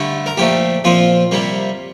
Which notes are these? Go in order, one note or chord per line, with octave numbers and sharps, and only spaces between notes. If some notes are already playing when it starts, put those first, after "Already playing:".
Already playing: G2 D3 A3
A#4
A#2 F3 A3 G4
A#2 F3 C4 F4
C3 G3 A#3